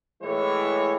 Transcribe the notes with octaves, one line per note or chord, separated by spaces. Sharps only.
A2 E3 G#3 C#5